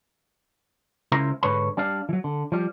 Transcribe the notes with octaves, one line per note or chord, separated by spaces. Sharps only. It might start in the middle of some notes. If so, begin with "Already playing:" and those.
C#2 C#3 E4 A#4 C5 A#5
G#2 D3 B4 C#5 B5
G3 D4 D5 F5
E3 F#3
D3
F3 G3